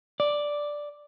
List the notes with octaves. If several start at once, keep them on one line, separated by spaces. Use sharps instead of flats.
D5